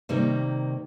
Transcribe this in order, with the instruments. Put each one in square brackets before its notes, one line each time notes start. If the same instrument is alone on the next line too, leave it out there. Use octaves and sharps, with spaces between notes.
[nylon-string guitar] C3 D#3 G3 A#3